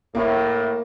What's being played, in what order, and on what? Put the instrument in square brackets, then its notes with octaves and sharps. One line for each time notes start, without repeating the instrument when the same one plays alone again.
[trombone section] A2 [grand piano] A#3